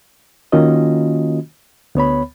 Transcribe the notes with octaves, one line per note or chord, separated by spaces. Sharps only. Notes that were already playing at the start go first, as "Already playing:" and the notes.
D#3 A#3 C#4 F4 F#4 D#5
D2 B3 C#5 B5